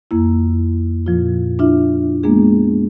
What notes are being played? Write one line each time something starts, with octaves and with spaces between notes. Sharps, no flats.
F2 A#3 E4
A#2 F3 F4
D4 E4 F4 E5
G#3 A#3 B3 D4 G#4